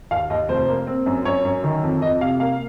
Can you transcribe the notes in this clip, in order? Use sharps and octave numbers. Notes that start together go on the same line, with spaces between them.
D#2 F5
D#2 D#5
F1 C5
A#3
C4
F#2
F#2 C#5
F#2
D#3
F2
F2 D#5
C3 F5
A#3 F5